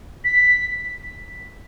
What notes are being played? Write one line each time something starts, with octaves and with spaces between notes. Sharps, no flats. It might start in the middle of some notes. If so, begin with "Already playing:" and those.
B6